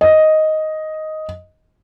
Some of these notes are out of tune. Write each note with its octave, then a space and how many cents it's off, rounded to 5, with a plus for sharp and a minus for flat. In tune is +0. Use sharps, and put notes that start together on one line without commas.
D#5 +5